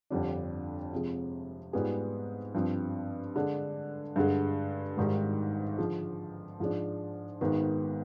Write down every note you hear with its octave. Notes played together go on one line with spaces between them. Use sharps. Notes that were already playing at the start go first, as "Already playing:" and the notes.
G1 F2 D3 G3 D4
C3 F3 G#3
G#2 G3 B3 F4 G#4
G2 F3 C4
D3 G#3 D4
G2 D3 G#3
G#1 G#2 D#3 G3
D3 F3 G#3
G#2 F3 G#3 D4
G#1 G#2 D#3 B3